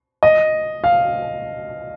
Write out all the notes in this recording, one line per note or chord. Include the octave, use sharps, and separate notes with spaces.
D#5
F5